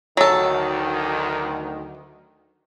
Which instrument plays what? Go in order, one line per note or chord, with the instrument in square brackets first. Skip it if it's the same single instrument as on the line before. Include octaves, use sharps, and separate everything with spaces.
[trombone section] D2 D#3 [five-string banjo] F#3 A4